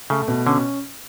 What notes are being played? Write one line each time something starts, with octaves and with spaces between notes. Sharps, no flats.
C#3 A3
B2
D3 C#4